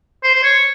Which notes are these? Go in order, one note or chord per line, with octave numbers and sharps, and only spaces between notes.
C5
C5
C#5